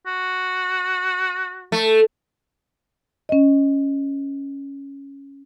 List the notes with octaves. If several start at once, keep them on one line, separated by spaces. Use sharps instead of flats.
F#4
A3
C#4 D#5